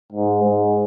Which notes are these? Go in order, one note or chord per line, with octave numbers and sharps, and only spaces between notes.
G#2
G#2